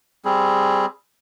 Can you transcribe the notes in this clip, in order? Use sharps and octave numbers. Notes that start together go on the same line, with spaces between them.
G3 C4 G#4